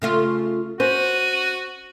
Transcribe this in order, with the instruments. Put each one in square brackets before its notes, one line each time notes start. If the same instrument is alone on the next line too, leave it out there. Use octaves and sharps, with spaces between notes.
[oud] C#3 A3 F4
[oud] C#4 [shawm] F#4 [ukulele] C5 [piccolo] D#7